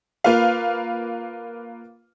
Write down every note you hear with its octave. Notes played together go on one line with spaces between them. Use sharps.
A#3 F4 B4 F5